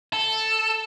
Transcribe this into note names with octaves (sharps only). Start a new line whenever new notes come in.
A4